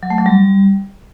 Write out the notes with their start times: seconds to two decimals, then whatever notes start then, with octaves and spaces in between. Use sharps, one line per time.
0.03 F#3
0.10 A3
0.18 F#3
0.26 G3